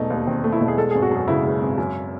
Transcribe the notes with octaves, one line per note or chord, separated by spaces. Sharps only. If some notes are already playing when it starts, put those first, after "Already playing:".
Already playing: E1 A3 D#4
D#2
D#3 C4
A3
E4
E1
G#4
G#3 A4
G#1 G#4
F#4
F#2 G#4
C#3 E4
G#3
G#1
F#2